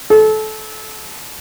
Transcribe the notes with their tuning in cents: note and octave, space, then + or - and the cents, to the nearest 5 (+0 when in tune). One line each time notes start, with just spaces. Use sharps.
A4 -25